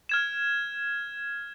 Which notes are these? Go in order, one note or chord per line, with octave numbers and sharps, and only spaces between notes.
F6 G#6 E7